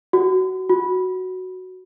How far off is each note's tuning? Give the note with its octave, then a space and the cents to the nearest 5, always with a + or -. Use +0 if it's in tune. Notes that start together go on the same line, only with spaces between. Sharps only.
F#4 +20
F#4 +0